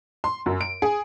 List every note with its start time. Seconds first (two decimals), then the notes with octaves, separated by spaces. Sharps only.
0.24 C6
0.46 F#2
0.61 D7
0.82 G#4